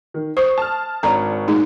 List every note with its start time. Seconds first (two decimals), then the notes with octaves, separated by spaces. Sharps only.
0.14 D#3
0.37 C5 C#6 D#6 C7
0.58 A5 F6
1.03 G#1 D4 C#5 A#5
1.48 A#2 G#3 D#4